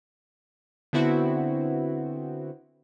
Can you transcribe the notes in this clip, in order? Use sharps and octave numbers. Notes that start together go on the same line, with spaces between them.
D3 B3 C4 E4 F#4